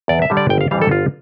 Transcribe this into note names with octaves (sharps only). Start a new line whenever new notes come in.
E2 D5
E5
D3 G3
D5
G1 G5
F5
F2 E3 G3 F5
A4
G1 F4